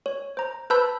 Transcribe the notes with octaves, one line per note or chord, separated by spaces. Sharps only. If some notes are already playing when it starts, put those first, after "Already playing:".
C#5
C5 A#5
B4 C5 A5 B5 E6 G6